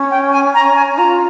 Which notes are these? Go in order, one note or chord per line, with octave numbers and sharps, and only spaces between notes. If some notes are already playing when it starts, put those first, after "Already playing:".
Already playing: C#4
G5
G#5
A#5
G#5
F4 A#5